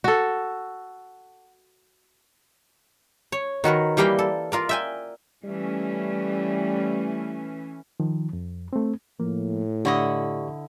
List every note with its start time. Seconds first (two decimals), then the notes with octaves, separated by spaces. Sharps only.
0.04 F#4 A4
3.32 C#5
3.64 D#3 F#4 A#4 B4
3.97 E3 G3 A#3 F5 G5 B5
4.19 A4
4.52 F4 A#4 D5
4.69 E5 G5 G#5
5.44 E3 G3 A3 C#4
8.00 D#3 F3
8.33 F2
8.73 A3 C4
9.20 A2 F3 A#3
9.85 D3 E4 G4 D5 D#5 C#6